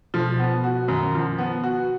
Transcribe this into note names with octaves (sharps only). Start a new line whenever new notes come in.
B2 F3
B3
F#4
F#2 D#3
F3
B3
F#4